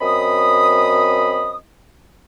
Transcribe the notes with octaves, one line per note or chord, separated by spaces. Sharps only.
F#2 C4 D#5 B5 D#6